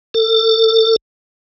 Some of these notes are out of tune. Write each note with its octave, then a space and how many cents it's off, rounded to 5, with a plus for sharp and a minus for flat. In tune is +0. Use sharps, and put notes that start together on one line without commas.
A4 +30